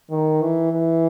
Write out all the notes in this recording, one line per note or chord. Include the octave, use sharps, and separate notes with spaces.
D#3
E3
E3